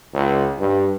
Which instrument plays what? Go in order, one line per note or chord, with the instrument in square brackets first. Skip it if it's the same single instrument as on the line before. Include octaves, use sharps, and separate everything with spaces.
[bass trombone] C#2
G2